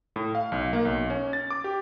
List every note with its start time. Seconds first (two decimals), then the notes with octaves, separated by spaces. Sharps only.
0.16 A2
0.35 F5
0.52 B1
0.73 A#3
0.85 B1
1.10 C#4
1.33 A6
1.51 D6
1.64 G4